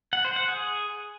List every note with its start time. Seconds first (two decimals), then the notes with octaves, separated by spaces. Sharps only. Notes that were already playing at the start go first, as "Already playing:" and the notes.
0.13 F#5
0.25 C5
0.36 F#5
0.48 G#4